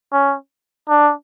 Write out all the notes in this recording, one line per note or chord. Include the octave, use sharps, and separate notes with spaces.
C#4
D4